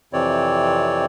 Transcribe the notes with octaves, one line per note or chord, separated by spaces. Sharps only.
F2 C3 E3 C4 C#5 D5